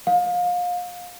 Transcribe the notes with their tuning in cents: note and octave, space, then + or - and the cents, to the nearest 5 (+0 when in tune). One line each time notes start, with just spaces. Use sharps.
F5 +30